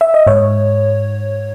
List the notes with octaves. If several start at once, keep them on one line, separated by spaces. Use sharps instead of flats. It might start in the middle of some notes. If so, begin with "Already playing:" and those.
E5
D#5
G#2 C#5